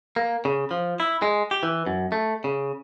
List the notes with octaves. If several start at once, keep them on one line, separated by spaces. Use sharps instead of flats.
A#3
C#3
F3
E4
G#3
G4
E3
F#2
A3
C#3